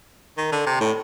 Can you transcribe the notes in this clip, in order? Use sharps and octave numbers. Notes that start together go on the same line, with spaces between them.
D#3
D3
C3
A2